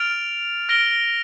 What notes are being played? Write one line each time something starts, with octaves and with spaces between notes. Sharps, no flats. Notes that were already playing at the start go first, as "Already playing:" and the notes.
Already playing: F6 A6 D7 F7
F6 A#6 D7 G7